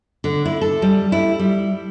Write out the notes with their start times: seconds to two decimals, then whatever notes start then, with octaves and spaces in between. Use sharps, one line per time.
0.24 D3
0.45 E4
0.61 A4
0.82 G3
1.12 E4
1.39 G3